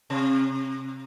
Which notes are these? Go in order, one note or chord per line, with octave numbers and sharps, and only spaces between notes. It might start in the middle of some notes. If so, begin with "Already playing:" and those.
C3